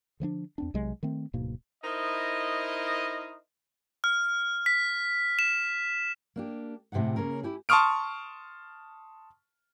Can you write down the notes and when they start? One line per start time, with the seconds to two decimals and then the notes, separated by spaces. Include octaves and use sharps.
0.20 D3 F3 A#3 D4
0.58 E2 C4 D4
0.74 B1 C3 F#3 G#3
1.03 D#3 A3 C4
1.33 D1 G#2 B2 A#3
1.83 D#4 E4 A#4 C5 D#5
4.04 F6
4.66 B6
5.39 E7
6.36 A#3 D4 G4
6.92 A2 C3 G4 G#4 F#5
7.16 C#3 A#3 C#4 G#4 A#4
7.43 E4 G4 G#5
7.69 A5 C6 C#6 D#6 F6 D7